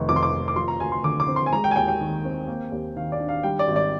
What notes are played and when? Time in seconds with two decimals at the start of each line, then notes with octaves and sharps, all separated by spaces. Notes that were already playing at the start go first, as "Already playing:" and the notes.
Already playing: F1 D#3
0.09 F2 D6
0.16 C6
0.23 D6
0.32 F1
0.48 D6
0.56 F3 C6
0.68 A#5
0.80 D2 G#5
0.92 C6
1.04 D3 D6
1.20 D6
1.28 C4
1.36 C6
1.46 G#5
1.52 G#3 A#5
1.64 G5
1.71 G#5
1.76 D#2 G5
1.88 G5
2.01 D#3
2.25 C4
2.48 A#3
2.72 D#2
2.96 D#3 F5
3.12 D5
3.20 D4
3.29 F5
3.43 G3 G5
3.59 D5
3.68 G#1
3.76 D5